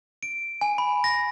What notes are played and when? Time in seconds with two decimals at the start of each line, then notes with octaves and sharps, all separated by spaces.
0.23 D7
0.61 G#5
0.78 B5
1.04 A#6